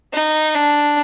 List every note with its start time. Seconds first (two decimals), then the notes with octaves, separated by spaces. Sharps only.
0.13 D#4
0.55 D4